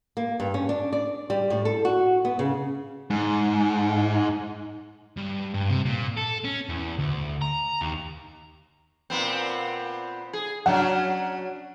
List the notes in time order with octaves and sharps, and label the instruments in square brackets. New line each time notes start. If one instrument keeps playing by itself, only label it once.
[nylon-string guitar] A#3
G2
C#4
D4
D5
G3
A2
A4
F#4
B3
C#3
[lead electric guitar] G#2
[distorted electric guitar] G2
G2
C3
A#2
A4
C#4
E2
D2
A#5
D#2
[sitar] A#2 B3 C4
G#4
[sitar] F#3 C#4 D4 [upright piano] F#5